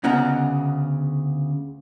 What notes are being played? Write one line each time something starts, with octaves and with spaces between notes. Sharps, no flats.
D2 C#3 B3 D#5 F#5 A#5